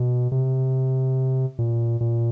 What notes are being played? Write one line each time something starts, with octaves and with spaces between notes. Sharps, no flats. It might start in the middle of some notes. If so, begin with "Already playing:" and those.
Already playing: B2
C3
A#2
A#2